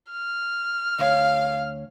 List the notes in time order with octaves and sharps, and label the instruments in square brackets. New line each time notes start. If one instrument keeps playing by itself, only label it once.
[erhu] F6
[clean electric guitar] D2 C#5 [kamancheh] F5